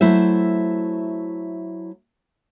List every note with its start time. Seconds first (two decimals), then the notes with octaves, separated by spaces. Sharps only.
0.01 F#3 A3 E4 C5 E5